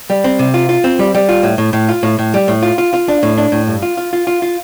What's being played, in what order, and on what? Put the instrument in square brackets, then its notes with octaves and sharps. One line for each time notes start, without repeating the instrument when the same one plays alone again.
[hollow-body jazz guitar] G3
C4
C3
F4
F4
C4
G3
G3
F4
A2
A2
A2
F4
A2
A2
G3
A2
F4
F4
F4
D4
A2
D4
A2
G2
F4
F4
F4
F4
F4